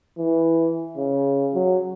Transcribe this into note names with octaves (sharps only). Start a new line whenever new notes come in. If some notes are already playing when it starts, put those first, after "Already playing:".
E3
C#3
F#3